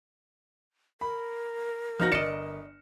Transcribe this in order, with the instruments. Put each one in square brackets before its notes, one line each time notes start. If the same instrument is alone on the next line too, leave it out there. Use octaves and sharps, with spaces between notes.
[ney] A#4 [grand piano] B5
[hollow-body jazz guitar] F3 D#4 F#4 [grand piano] F6 A#6
[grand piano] G1 C#7 E7 [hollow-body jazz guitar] D5 D#5